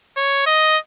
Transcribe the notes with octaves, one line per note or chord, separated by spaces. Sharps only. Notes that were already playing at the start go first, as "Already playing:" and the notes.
C#5
D#5